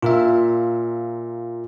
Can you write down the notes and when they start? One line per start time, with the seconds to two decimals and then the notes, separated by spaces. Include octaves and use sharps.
0.02 A#2 F4 A#4 E5